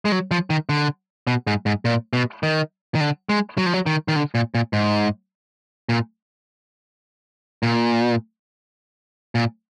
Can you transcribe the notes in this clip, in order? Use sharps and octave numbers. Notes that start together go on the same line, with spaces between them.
G#3
F#3
F3
D#3
D3
B2
G#2
G#2
A#2
B2
D#3
D#3
D3
G#3
F#3
F3
F#3
D#3
D#3
D3
A#2
A#2
G#2
A#2
A#2
A#2